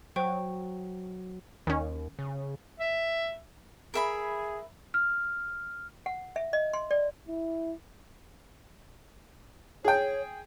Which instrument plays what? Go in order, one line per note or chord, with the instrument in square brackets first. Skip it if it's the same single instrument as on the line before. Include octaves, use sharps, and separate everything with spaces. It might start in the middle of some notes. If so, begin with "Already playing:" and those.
[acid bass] F#3 [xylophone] C5 G5 C#6
[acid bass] D#2 [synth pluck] D#3 C#4
[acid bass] C#3
[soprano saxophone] E5
[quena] G#4 [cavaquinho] A#4 E5 B5
[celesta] F6
[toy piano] F#5
E5
D#5
C6
D5
[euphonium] E4
[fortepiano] G#4 G5 [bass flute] C#5